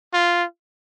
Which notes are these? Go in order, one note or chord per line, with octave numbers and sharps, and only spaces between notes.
F4